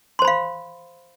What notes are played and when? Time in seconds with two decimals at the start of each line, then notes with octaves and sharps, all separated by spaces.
0.19 C6
0.22 C5
0.25 B5
0.28 F5